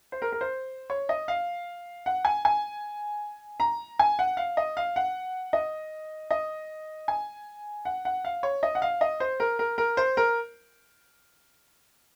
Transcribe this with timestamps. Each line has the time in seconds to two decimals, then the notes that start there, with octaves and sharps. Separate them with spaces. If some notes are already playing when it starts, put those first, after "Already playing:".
0.12 C5
0.22 A#4
0.32 A#4
0.41 C5
0.90 C#5
1.09 D#5
1.28 F5
2.06 F#5
2.25 G#5
2.45 G#5
3.60 A#5
3.99 G#5
4.19 F#5
4.37 F5
4.57 D#5
4.77 F5
4.96 F#5
5.53 D#5
6.31 D#5
7.08 G#5
7.85 F#5
8.05 F#5
8.25 F5
8.43 C#5
8.63 D#5
8.75 F#5
8.82 F5
9.01 D#5
9.20 C5
9.40 A#4
9.59 A#4
9.78 A#4
9.97 C5
10.17 A#4